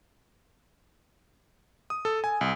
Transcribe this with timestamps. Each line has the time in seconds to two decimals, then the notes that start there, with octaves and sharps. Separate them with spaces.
1.90 D#6
2.05 A4
2.24 G#5
2.41 C2